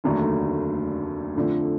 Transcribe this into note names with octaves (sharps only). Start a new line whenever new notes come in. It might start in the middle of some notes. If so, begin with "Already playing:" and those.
F1 D#2 D3 F#3 A3
F2 D3 F3 A3